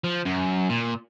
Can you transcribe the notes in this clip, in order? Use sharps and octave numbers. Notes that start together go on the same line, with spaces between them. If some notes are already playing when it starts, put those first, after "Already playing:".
F3
F#2
A#2